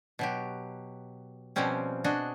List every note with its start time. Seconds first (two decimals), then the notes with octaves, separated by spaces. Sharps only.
0.19 B2 F#3 G4
1.56 B2 F3 G3 C4 C#4
2.04 D4 F#4 G#4 D#5